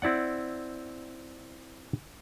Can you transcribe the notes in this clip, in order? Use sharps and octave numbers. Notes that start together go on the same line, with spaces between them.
C4 E4 D5 F#5